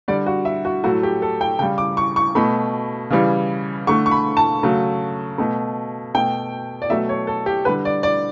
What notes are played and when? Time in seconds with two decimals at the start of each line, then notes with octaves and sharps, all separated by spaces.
0.08 D3 G3 D5
0.26 F#4
0.45 E5
0.65 F#4
0.84 A2 F#3 A3 F#4
1.03 G4
1.22 A4
1.41 G5
1.59 C#3 G3 G5
1.78 D6
1.97 C#6
2.16 C#6
2.35 B2 A3 B5
3.10 C#3 E3 G3
3.87 D3 A3 C#6
4.06 C#6
4.11 B5
4.37 A5
4.63 C#3 F#3 A3
5.38 B2 A3
6.14 B2 A3 G5
6.82 D5
6.90 B2 F#3 A3 E5
7.09 C#5
7.27 A4
7.46 G4
7.65 D3 G3 B4
7.85 D5
8.03 D5